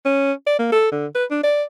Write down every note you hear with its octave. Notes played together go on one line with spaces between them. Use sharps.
C#4
D5
A#3
A4
D3
B4
D4
D5